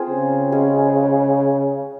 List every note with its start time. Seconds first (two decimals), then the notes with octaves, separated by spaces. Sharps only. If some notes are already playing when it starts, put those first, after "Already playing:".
Already playing: C4 F4 G#4 C5
0.10 C#3
0.52 G#3 C#4 G#4